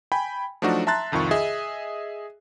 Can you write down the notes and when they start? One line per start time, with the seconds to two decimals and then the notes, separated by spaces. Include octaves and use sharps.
0.12 G5 G#5 B5
0.62 F3 F#3 A3 D4 D#4 F#4
0.87 E5 A5 A#5 C6 F#6 A6
1.12 C2 F2 D#3 F4 C#6
1.31 G#4 D#5 E5